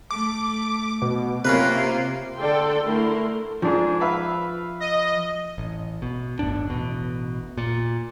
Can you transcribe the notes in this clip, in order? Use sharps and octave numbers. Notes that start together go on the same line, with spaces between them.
A3 D6
B2
C3 A#3 C#4 F4 A#4 B4
D3 A4 D5 G5 C6
D3 A3 E4 A#4 C6
G#2 F3 D4 G#4
B4 E5 F5
D#5
A1
B2
G1 D#2 A2 D4
A1 B2
A#2